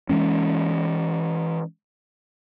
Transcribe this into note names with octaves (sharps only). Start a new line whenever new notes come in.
E3 G#3 C#4